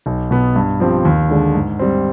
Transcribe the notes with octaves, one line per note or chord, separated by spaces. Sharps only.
B1
B2 B3
G2
F3 C4 G4
D#2
D3 G#3 D4
G#2
G3 C4